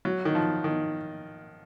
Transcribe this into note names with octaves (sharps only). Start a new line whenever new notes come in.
F#3
D#3
F3
D#3